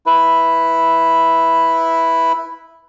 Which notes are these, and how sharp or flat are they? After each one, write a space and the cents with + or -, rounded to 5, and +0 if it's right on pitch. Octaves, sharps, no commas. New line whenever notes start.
E4 +0 B4 +0